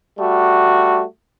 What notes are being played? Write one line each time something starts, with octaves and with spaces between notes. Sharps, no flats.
G3 A3 F#4